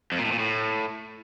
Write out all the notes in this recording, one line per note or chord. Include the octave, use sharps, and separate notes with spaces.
F2
A#2
A2
A#2
A2